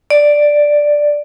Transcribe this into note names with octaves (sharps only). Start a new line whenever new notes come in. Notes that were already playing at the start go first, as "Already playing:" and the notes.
D5